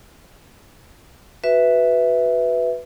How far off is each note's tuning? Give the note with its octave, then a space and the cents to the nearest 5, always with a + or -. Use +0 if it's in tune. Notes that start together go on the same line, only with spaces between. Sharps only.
F#4 +0 B4 +0 E5 +0